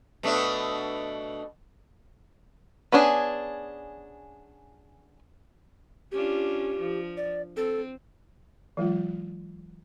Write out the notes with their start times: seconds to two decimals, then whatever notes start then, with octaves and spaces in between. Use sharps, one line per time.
0.23 B2 A3 D4
2.92 B3 C#4 D4 G#4
6.12 C#4 D4 F4 G4
6.79 F3
7.17 D5
7.57 C4 A4
8.77 E3 F#3 G#3 F4